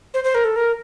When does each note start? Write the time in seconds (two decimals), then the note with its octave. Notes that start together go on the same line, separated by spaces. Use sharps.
0.14 C5
0.24 C5
0.35 A#4
0.44 A4
0.56 A#4